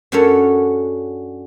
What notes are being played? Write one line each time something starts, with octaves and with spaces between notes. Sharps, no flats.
F#2 C#4 D4 F#4 A4 C#5